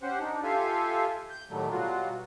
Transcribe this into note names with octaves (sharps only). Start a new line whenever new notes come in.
C#4 G4 C5 F#5
D4 D#4
F4 G4 A4 E5 F5 G#5
G6
A2 D#3 F#3 G3 A3
B2 F#3 G3 F4 F#4